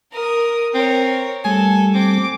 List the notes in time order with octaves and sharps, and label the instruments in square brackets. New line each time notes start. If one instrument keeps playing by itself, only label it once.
[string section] A#4 D#6
[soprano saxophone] C4 [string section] A#4 C#5
[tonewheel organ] G3 A3 [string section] A4 [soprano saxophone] G#5
[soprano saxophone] C4 [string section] D6